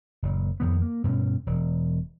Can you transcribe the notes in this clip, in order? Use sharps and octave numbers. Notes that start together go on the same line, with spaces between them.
F#1 A#2
F2 D#3 B3
A#3
G2 B2 C#4
E1